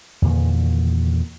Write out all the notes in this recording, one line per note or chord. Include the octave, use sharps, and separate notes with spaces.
E2 A#2 D3 D#3